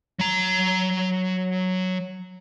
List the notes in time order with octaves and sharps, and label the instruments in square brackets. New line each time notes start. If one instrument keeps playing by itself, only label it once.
[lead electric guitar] F#3 A#5